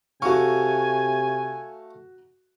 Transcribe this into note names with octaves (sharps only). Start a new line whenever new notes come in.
C3 A3 F#4 F5 G#5 C#6